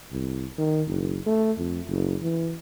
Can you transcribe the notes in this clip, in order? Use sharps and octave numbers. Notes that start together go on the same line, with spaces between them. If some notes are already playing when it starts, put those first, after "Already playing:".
C2
D#3
F#1
A3
F2
F#1
E3